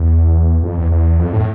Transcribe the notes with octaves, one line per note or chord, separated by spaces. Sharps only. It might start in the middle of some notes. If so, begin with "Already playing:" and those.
Already playing: E2
F2
E2
E2
F2
A2